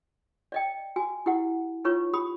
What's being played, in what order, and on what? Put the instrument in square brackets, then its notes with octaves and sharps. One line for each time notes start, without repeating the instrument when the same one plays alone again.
[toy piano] D5 D#5 G5
F#4 G#5
E4 G4 F#5
D#4 F4 B4 C#5 C#6
G4 B5 D#6